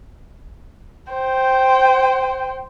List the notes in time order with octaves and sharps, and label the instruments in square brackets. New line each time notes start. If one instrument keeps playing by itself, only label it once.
[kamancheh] C5 G5